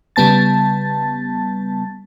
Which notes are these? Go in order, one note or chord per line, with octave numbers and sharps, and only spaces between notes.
C#3 G3 B3 A5 A6